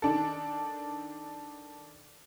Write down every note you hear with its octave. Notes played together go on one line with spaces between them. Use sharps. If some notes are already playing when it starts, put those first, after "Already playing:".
D#3 D4 A4